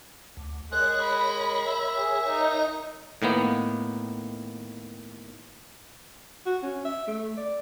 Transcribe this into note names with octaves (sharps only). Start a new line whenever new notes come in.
D2
G#3 A#4 C#5 F#6
B5
E5
G#4
D#4
A2 D#3 A#3 B3
F#4
C#4
E5
A3
D5